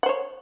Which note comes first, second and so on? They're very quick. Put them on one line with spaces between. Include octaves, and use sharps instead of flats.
F#5 C5 C#5